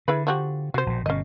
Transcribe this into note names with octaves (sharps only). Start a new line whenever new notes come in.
D3 E4 G#4 B4
F3 F#4 G4
C3 F#4 C5
A#1 B2
G1 B2 C#4 D#5